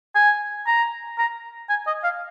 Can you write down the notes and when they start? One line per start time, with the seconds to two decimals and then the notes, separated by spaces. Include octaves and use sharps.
0.15 G#5
0.67 A#5
1.18 A#5
1.69 G#5
1.87 D#5
2.04 F5